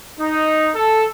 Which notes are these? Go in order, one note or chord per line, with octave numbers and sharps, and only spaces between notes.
D#4
A4